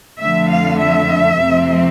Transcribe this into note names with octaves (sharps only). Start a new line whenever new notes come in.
F2 D3 F3 A3 E5
F5
E5
F2 C3 F3 A3 C4